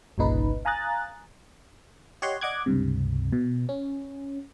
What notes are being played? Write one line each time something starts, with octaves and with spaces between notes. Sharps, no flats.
G1 C2 A#2 C#3 D#4 B4
F5 G#5 A#5 D#6 F#6 A6
G4 C#5 D#5 F#5 C6
D5 D#5 F#5 D6 F#6 G#6
C#2 G2 C3
B2
C#4